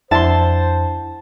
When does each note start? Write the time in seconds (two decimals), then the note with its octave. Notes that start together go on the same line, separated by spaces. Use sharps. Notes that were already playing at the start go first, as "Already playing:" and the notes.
0.11 F2 D4 E4 C5 F#5 A5 C6